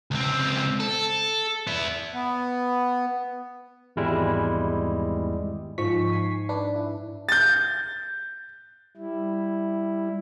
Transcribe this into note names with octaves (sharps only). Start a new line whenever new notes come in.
C#2 C4
A4
B3 E4
B3
G#1 E2 G3 G#3 E4
G#2 F3 C#6 B6
G#5 C7
D4 B4
E4
G6 A6
G3 E4